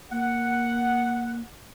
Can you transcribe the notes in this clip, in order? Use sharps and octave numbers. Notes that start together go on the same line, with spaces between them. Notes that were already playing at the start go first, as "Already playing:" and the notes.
A#3 F#5